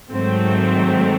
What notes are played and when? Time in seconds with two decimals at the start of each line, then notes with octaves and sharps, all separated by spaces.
0.12 G#2 D#3 F#3 A3 C4